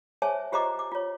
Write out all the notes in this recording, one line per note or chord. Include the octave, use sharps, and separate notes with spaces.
G#4 C5 C#5 E5 G#5 A5
F4 G4 C5 D#5 A#5 D6
D6
F4 C#5